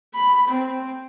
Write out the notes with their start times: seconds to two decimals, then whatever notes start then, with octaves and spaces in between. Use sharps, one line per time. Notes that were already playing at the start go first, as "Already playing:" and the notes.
0.14 B5
0.49 C4